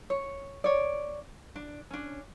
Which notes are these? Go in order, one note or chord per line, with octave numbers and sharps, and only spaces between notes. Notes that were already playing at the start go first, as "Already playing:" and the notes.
C#5
C#5 D5
D4
C#4 D4